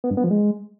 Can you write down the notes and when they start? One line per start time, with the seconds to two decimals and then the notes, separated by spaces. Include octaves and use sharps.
0.04 B3
0.10 G2
0.17 B3
0.24 F3
0.31 G#3